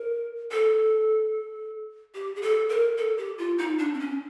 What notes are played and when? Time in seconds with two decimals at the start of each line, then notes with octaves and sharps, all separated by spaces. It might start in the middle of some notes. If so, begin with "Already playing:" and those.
Already playing: A#4
0.51 A4
2.15 G4
2.36 G#4
2.42 A4
2.69 A#4
2.97 A4
3.17 G4
3.38 F4
3.58 D#4
3.78 D4
3.94 C4
4.00 C#4